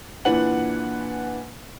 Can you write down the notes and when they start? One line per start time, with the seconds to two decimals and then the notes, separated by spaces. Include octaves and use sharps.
0.25 A#2 E3 D4 B4 F#5 F#7